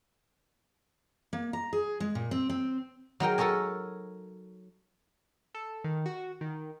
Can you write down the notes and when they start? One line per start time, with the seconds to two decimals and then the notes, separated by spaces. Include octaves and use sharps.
1.33 A#3
1.53 A#5
1.73 G#4
2.00 G#3
2.15 A#2
2.31 C4
2.50 C4
3.20 F#3 D#4 A#4 G5
3.38 A4 A#4 C#5 D#5 G#5
5.55 A4
5.84 D#3
6.06 F#4
6.41 D#3